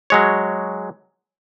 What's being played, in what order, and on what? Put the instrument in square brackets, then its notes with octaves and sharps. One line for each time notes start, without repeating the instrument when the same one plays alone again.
[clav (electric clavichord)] F#3 G#3 C#5